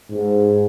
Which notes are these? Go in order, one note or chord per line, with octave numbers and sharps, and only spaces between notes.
G#2